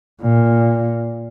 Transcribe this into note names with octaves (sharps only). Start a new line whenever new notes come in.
A#2